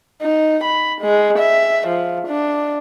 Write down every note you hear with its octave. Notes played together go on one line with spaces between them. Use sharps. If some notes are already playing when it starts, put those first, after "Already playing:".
D#4
B5
G#3
E5
F3
D4